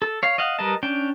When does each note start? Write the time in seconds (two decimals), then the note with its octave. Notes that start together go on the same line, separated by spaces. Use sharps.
0.02 A4
0.23 C#5 F5
0.38 D#5 F5 F#5
0.59 G3 A#4 B4 D#5 A5
0.83 C#4 D4 G5